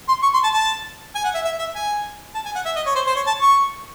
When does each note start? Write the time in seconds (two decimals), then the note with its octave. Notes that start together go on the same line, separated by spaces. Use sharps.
0.09 C6
0.23 C#6
0.34 C6
0.43 A5
0.54 A5
1.15 G#5
1.25 F#5
1.35 E5
1.45 E5
1.59 E5
1.75 G#5
2.35 A5
2.45 G#5
2.55 F#5
2.65 E5
2.76 D#5
2.86 C#5
2.95 C5
3.07 C5
3.16 C#5
3.27 A5
3.42 C#6